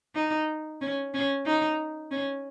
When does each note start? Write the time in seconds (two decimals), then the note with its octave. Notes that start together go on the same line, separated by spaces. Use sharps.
0.15 D#4
0.81 C#4
1.14 C#4
1.46 D#4
2.11 C#4